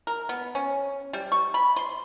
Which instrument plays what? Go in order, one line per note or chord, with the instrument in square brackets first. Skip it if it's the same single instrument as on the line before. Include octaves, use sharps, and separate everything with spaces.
[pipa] A#4
B3
C#4
G3
C#6
B5
C6